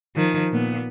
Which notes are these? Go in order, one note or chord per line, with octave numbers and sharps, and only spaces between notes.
D#3 F3
A#2 B3